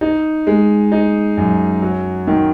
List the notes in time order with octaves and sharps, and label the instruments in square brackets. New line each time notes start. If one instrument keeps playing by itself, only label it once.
[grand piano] D#4
G#3
D#4
F#2
F#3
D#3